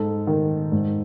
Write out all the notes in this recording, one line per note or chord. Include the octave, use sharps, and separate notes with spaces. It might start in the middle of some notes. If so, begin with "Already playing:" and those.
Already playing: G#2 A4
D#3
G#2